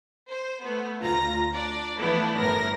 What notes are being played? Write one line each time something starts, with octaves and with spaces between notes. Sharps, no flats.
C5
A3 B3
D2 F4 A#5 A#6
D4 D5
E3 F3 A3 B3 D4 E4
G1 A2 A#4 A#6